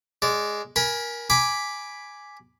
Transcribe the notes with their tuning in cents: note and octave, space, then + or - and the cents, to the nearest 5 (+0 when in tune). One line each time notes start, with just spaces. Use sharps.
G#3 +0 D5 -15
A#4 +15 G#5 +0 B5 -20
G#5 +0 B5 +0 D6 +0